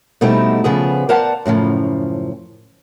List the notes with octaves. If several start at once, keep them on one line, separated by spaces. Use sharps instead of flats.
B2 G3 A3 C4 D#4 E4
C#3 F3 B3 G#4
A#4 C5 D5 F5 F#5 A5
F#2 A2 C#3 F3